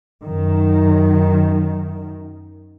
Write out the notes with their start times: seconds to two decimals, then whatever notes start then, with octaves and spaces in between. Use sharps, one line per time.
0.22 F#2 D#3